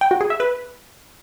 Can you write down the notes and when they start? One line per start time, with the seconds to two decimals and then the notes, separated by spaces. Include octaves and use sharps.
0.01 G5
0.11 F#4
0.21 G#4
0.30 E5
0.40 B4